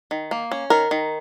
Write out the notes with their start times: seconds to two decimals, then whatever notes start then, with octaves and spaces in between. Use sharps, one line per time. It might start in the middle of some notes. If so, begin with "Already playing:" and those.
0.11 D#3
0.31 A#3
0.52 C#4
0.70 D#3 A#4
0.91 D#3